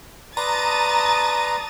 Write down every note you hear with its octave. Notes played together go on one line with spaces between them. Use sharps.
B4 D5 A5 A#5 C6 D#6 A6